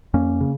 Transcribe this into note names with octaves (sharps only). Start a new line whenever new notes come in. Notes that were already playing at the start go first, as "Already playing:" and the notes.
F2 A#3 C#4
C#3